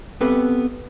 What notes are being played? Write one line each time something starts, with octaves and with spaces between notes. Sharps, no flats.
B3 C4 G4 A4 B4